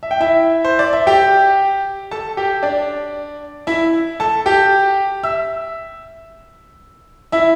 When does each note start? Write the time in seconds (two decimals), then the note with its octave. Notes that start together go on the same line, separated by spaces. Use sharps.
0.03 E5
0.11 G5
0.20 E4 E5
0.65 C5
0.79 D5
0.93 E5
1.07 G4 G5
2.11 A4 A5
2.37 G4 G5
2.63 D4 D5
3.67 E4 E5
4.20 A4 A5
4.46 G4 G5
5.23 E5 E6
7.32 E4 E5